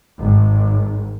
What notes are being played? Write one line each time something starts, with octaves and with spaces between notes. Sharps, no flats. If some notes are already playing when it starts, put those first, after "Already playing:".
G#1